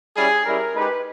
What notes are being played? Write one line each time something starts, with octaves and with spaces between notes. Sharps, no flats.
G3 C#4 E4 G#4
G3 C#4 E4 G4 A#4
G#3 D#4 G4 B4